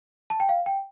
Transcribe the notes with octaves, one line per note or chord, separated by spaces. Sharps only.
A5
G5
F5
G5